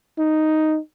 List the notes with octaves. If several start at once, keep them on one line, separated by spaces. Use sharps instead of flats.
D#4